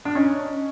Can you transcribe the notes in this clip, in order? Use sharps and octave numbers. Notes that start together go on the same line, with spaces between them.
D4
C#4 D#4